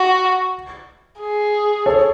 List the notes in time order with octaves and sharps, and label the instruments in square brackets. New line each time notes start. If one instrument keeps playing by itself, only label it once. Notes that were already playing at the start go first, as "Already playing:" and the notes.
Already playing: [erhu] F#4
G#4
[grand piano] A4 C#5